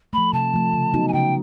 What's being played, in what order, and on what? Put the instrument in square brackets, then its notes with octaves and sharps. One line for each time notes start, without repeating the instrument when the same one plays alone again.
[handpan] F3 A3 [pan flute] B5
[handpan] C3 [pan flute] A5
[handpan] F3 A3
C#3
F#3 B3 D#4 F#4
[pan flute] G#5
[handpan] C#3 [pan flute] G5